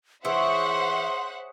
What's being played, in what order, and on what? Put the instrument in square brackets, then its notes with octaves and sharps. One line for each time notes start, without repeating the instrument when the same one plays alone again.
[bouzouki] E3 [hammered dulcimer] G#4 C#5 [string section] C5 E5 F#5 [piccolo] C6